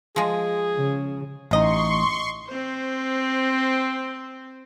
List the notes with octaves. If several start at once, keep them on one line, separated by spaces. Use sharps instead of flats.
F3 G#3 G#4
C#3
A1 C3 D#4 D#5 C6 C#6
C4 C5